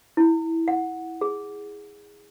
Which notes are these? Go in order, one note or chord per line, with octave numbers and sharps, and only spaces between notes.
E4
F#5
G#4